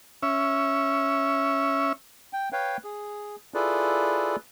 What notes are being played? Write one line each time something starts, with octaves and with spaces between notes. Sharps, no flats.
C#4 E5
G5
B4 C#5 F5 G5
G#4
E4 F4 G#4 A4 B4 D5